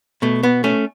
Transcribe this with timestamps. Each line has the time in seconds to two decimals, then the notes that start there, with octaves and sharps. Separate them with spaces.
0.22 B2 A3
0.43 B3
0.64 A3 C#4